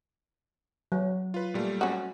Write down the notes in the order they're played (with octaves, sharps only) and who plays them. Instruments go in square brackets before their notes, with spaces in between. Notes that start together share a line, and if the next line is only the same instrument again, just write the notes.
[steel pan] F#3
[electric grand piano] F4 B4
A#2 G3 A3
[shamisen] C#4 F#4